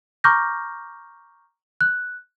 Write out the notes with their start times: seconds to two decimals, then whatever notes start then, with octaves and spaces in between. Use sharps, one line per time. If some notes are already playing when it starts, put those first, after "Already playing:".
0.24 A#5 C#6 D6 F6 G6 A#6
1.81 F#6